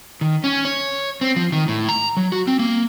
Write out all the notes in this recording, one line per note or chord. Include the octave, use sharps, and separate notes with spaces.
D#3
C#4
C#5
C4
F3
D#3
A2
A#5
F#3
F#4
C4
A#3